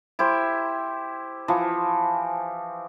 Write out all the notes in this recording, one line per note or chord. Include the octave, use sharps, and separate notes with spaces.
E4 G4 C5
E3 F3